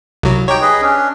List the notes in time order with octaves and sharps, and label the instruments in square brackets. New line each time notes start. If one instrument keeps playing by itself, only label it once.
[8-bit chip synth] C2 F#3
[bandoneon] D#4 G4 [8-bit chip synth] C#5 G5
[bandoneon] G#4 B4 D#5
C#4 D4